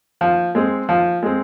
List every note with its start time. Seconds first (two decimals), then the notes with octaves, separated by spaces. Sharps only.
0.21 F3
0.55 G#3 C4
0.89 F3
1.23 G#3 C4